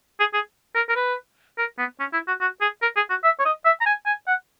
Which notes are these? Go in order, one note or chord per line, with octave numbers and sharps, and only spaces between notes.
G#4
G#4
A#4
A#4
B4
A#4
B3
C#4
E4
F#4
F#4
G#4
A#4
G#4
F#4
E5
C#5
D#5
E5
A#5
G#5
G#5
F#5